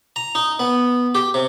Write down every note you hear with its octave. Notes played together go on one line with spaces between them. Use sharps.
A#5
D#4
B3
G4
C3